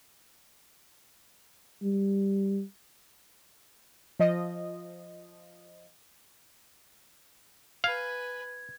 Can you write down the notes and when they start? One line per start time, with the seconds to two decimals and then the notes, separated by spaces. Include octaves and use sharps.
1.83 G3
4.19 F3 D#5
7.84 B4 F5 G#5 G#6